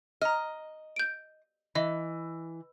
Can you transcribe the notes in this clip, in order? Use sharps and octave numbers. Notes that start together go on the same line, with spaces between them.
D#5 A#5 F6
G6 D7
E3 D#5